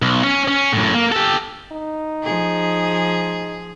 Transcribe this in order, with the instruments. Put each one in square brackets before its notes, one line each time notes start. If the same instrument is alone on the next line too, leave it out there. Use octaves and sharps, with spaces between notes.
[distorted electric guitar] B1
C#4
C#4
F#2 A2
A#3
G4 A4
[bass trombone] D#4
[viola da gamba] F3 G#4